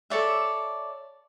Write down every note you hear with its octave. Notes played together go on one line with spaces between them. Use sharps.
A4 C#5 D5 E5